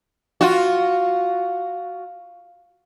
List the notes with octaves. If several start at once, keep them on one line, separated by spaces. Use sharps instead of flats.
F4 F#4